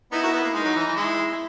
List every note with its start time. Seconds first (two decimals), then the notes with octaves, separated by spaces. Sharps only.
0.12 B3 D#4 E4
0.23 F#4 A#4
0.33 B3
0.44 A#3
0.54 G#3 D#4
0.64 F#3
0.75 E3
0.86 E3
0.96 G#3 E4